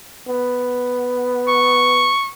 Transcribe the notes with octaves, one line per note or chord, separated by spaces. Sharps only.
B3
C#6